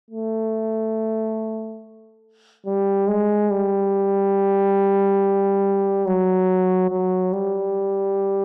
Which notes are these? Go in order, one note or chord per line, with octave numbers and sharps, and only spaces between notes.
A3
G3
G#3
G3
F#3
F#3
G3